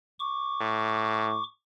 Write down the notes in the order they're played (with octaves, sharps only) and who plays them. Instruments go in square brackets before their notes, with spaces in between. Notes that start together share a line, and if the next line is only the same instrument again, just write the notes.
[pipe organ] C#6 D6
[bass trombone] A2